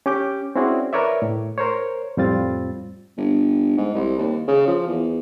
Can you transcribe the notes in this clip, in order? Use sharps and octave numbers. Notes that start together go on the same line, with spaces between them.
C#4 G4 D6 G6
C4 C#4 E4 F#4 G#4 D5
A#4 B4 C#5 D5 E5
A2
A#4 C5 C#5
F2 A2 G3 C4 F4 A6
G1
G#2
C2
D#2
C#3
F3
E2